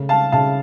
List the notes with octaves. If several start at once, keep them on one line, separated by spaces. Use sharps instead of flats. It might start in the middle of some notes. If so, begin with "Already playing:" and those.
Already playing: C#3 A3
F5 A5
C#3 F5 A5